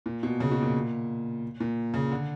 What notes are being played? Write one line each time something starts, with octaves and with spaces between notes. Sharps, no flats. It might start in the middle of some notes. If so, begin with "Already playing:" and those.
A#2
B2
C#3
B2
A#2
A#2
C#3
D3